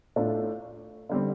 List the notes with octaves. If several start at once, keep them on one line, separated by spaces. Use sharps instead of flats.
A2 A3 D4 F4
D3 G3 C4